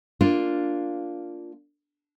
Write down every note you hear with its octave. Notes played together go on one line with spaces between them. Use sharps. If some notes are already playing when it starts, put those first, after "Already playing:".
A#3 D4 F4